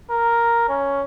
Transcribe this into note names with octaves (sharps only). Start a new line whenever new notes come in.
A#4
C#4